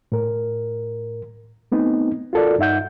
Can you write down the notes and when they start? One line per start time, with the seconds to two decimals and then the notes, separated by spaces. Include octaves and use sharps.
0.12 A2 A#4
1.72 A3 B3 C4 D#4
2.33 F4 F#4 A4 A#4 D5
2.58 G2 D#4 E5 F#5 G6